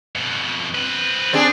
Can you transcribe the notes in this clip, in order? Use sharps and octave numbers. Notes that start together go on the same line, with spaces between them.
F2 B2
C4 B4
C4 D4 G#4